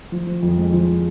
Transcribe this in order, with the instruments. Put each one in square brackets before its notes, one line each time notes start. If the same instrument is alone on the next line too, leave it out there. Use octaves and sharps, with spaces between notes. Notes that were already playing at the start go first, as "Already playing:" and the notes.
[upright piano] F3
F3
F2
G#3
F3